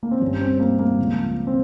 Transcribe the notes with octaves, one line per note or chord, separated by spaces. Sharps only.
A#3
C4
G1 G2 G3 C#4
C4
A#3
A#3
C#2 C#3 F3
C4